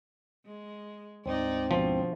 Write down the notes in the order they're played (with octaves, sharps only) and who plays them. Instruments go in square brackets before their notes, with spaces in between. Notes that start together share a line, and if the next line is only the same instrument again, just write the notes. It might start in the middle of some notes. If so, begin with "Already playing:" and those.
[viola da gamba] G#3
[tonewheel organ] D2 G#2 C4 [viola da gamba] D#4 D5
[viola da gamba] B2 D4 [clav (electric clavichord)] F3